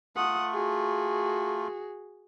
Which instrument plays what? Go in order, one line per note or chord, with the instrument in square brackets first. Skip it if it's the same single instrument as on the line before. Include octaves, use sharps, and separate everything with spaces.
[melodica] A3 F4 [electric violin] F#5 D#6
[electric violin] F#4 G#4